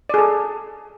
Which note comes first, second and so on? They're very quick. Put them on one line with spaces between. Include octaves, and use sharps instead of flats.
D5 G#4 A4